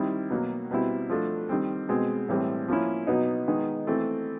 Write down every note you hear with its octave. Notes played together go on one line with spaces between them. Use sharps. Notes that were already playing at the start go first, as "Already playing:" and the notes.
Already playing: D#3 G3 C4 E4
B2 F#3 A#3
B2 G3 C4 E4
F3 A3 D4
D#3 G3 C4
B2 G#3 C4
A2 E3 G3 C4
F3 A#3 C#4 E4
B2 F#3 B3 D#4
D#3 G#3 B3 D#4
E3 A3 C4